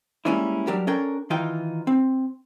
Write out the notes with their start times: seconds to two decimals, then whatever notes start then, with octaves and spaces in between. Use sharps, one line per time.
0.25 G3 G#3 A#3 C#4 D4 E4
0.67 F#3 G3 D4 G4 A#4
0.87 C#4 D4 A4 A#4 G5
1.30 D#3 E3 D#4 F4 G5
1.87 C4